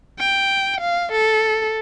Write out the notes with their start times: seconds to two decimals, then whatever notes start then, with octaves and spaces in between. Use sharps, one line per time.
0.19 G5
0.81 F5
1.12 A4